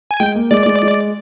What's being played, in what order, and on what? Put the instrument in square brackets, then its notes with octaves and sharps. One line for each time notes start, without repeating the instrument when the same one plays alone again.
[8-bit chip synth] G#5
[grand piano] G#3 [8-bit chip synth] G5
[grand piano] A#3
[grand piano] G#3 [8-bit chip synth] D5
[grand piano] G#3
G#3